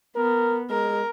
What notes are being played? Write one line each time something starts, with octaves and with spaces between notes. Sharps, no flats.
B3 A#4
G#3 A#4